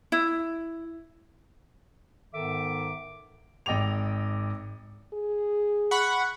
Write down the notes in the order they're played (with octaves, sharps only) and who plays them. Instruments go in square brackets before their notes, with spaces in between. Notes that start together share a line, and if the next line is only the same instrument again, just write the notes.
[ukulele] E4
[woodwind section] G#2 D#3 B3 A4 E5 D6
[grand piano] G#1 D#5 G5 D6 F7
[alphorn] G#4
[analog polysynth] F#5 B5 C#6